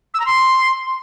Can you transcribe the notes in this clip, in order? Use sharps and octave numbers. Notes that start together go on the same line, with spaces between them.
E6
A#5
C6